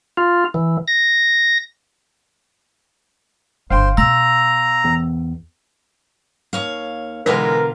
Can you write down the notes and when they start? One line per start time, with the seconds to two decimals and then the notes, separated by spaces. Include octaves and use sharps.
0.17 F4
0.54 E3
0.88 A#6
3.70 G1 C5 F5 G5 C6
3.97 B2 A#5 E6
4.84 E2
6.53 D#2 C#5 F5
7.26 B2 D3 E3 G#3 F4 A#4 B4 B6